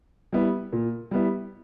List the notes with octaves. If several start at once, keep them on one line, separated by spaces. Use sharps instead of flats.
G3 B3 E4
A#2
G3 B3 E4